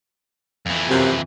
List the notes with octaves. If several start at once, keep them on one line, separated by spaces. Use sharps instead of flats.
F2 E3
F#2 C3